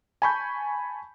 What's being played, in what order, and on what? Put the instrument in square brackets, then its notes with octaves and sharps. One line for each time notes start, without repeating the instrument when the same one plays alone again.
[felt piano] G#5 A5 B5 C#6 G6